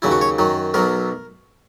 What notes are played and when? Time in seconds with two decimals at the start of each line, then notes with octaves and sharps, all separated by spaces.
0.02 D#2 C#3 F#3 E4
0.12 F#4
0.21 C#5
0.39 F#2 D#3 F#3
0.74 B1 B2 F#3 A#4